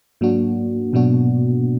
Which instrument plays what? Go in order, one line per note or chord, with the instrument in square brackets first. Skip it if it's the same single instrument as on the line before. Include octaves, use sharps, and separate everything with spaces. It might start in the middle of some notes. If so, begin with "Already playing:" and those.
[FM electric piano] G#2 F#3 D4 F#4 [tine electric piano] A#3
[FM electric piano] G#2 F#3 D4 F#4 [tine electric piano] B2 B3